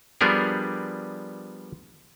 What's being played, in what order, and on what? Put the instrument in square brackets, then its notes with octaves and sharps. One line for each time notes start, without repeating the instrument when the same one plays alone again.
[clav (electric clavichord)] F3 G3 B3 D4 G#4 A#4